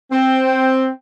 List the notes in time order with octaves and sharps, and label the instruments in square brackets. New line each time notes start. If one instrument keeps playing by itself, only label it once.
[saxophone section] C4